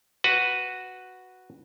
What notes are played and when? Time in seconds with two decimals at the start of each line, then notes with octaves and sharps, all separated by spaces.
0.24 F#4 B4